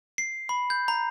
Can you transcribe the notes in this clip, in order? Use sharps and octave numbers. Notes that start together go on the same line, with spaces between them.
C7
B5
G6
A#5